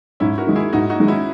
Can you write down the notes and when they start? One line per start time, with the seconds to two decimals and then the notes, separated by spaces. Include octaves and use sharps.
0.20 G#2 C#4 E4
0.38 F#4 A#4
0.47 D#3 G#3
0.55 E4 G#4
0.73 G#2 D#4 F#4
0.90 D#4 F#4
1.00 D#3 G#3
1.08 C#4 E4